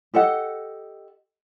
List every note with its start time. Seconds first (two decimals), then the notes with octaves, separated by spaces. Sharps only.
0.14 G4 A4 D#5 F#5